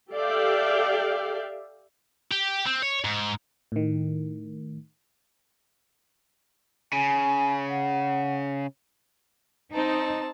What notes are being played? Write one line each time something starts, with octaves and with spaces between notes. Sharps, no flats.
G4 A4 D5 E5 F5 G5
G4
C4
C#5
G#2
A2 D#3
C#3 G#5
F#5
C4 D#4 A5